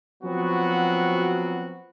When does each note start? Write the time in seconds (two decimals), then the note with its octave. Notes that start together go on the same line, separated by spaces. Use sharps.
0.23 F3 F#3 B3 C4 F#4